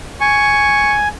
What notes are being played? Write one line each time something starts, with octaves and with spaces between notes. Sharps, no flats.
G#5 C#6